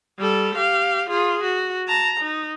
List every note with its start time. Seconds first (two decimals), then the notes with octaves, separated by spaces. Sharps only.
0.18 G3 A4
0.55 G4 F5
1.09 F4 G#4
1.43 F#4
1.88 A5 A#5
2.20 D#4